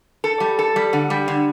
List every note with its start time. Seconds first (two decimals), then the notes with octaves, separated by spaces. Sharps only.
0.24 A4
0.40 G3
0.59 A4
0.76 G3
0.93 D3
1.10 G3
1.28 D3